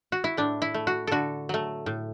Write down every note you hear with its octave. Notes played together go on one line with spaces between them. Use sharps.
F#4
E4
A2 D4
E4
A3
F#4
D3 F#4 A4
F#3 A3
A2